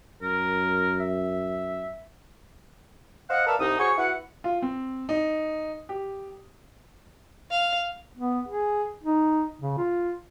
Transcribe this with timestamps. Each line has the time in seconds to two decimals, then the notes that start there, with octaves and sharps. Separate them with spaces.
0.22 F#2 A#4
1.00 E5
3.30 C5 D#5 F5 F#5
3.46 A#4 B4 D5 E5 F5 A5
3.60 C2 D#4 D#6
3.78 F#4 G#4 C5 C#5 C#6
3.98 E4 F#4 B4 F#5
4.44 F4
4.62 C4
5.09 D#4
5.89 G4
7.51 F5
8.18 B3
8.48 G#4
9.03 D#4
9.61 C#3
9.78 F4